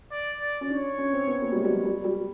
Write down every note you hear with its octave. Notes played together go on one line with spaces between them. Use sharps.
D5
D5
C#4
D4 C#5
C#4
C4
B3
A#3
G3
G#3
G3
F#3
G3
G3